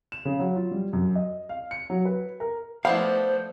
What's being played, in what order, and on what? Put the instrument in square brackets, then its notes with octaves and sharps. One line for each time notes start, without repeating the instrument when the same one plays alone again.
[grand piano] E7
C#3
F#3
F4
G3
F#2
D#5
F5
C#7
F#3
B4
A#4
[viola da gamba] F3 A3 [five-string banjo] B3 D4 E4 [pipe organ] C5 [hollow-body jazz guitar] F5